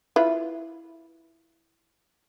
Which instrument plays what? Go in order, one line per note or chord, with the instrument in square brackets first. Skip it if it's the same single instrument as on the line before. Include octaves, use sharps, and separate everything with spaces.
[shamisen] E4 F4 B4